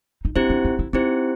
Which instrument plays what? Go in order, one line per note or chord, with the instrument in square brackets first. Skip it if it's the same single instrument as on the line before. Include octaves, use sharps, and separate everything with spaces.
[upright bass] D#4
[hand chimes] C4 E4 G4 C5 [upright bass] D4
[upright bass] D4
D#4
E4
[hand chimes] C4 E4 G4 C5 [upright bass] D#4